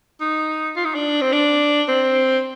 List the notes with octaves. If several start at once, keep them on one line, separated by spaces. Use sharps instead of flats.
D#4
F4
D#4
D4
C4
D4
C4